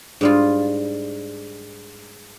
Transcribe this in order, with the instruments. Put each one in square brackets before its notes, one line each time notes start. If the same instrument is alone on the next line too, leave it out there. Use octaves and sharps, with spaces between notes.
[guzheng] G#2 G3 F4 [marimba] D4